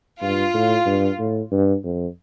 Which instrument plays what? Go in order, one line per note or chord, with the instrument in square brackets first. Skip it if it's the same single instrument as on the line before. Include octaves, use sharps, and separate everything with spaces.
[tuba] G2 [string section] F4
[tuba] A2
G2
A2
G2
F2